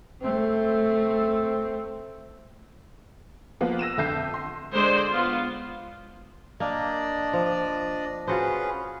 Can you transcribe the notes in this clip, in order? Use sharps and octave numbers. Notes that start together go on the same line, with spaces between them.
A3 C4
F3 A#3 B3 F4
E6 A#6 D#7 E7
F2 D3 E5 A5 G6 C7
C6
D3 G#3 C5 D5
B3 F4
A#3 D4 D5 D#5
F3
C#4 F4 F#4 G#4 B4 C5